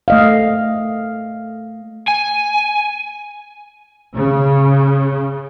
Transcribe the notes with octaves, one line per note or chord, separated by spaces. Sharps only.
A3 D#5 F5
G#5
C#3